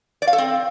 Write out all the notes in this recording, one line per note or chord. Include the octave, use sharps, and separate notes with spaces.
D5
F5
A4
C4